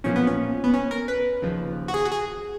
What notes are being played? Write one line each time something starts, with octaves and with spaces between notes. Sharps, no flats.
B1 A#2 F3 C#4
B3
C#4
B3
C#4
A#4
B4
D#2 C#3 F3
F#4
G#4
F#4
G#4